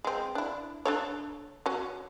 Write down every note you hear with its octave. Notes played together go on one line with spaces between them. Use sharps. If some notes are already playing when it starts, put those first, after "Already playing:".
G#3 C4
D4 E4
D4 A4 C#5
F#3 C#4